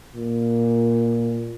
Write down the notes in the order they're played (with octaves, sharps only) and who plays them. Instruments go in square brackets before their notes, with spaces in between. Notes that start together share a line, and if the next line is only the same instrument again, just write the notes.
[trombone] A#2